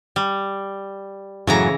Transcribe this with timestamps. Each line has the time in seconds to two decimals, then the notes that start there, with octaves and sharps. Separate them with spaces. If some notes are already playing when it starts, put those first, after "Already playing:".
0.16 G3
1.47 F#2 A2 C#3 E3 F#3 A#5